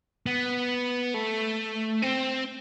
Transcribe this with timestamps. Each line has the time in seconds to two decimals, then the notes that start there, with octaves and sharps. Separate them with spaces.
0.26 B3
1.14 A3
2.03 C4